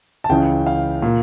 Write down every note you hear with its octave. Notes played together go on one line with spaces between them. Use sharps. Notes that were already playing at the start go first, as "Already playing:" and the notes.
A5
C#2 C#3 E3 G5
F5
A#2